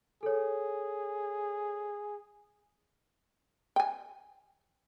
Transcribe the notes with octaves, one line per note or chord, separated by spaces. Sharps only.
G#4 A4 C#5
G5 G#5